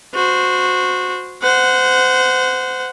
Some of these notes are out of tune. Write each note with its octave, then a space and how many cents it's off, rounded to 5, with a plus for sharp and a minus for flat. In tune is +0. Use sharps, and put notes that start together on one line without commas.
F#4 -20 C5 -15
C5 -25 F#5 -5